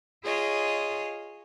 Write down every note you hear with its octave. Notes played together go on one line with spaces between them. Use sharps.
F4 G#4 C#5 D#5